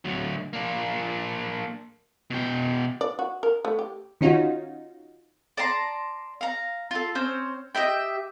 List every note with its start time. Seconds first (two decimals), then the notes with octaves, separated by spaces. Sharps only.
0.05 D2 F#3
0.53 A#3 D4
2.30 B2 G5
3.01 D5
3.19 F#4
3.43 A#4
3.65 A3
3.79 G4
4.21 D#3 C#4 D#4 F4 F#4
5.57 D5 A5 A#5 C6
6.41 F5 A#5
6.91 F4 A4
7.15 C4 C#4 C5
7.75 G4 D#5 E5 G5